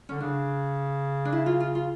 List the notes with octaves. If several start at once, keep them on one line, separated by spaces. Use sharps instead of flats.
D3 C#4
C#3 D4
D4
E4
F4
F4
F4